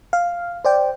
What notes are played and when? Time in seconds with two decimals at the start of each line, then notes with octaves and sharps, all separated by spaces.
0.13 F5
0.65 C5 D5 G5